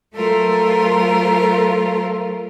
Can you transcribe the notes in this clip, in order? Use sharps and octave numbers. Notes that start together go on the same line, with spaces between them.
F#3 A3 F4 A4 A#4 C5